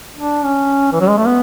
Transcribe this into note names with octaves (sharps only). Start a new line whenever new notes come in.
D4
C#4
E3
F#3
G#3
A3
B3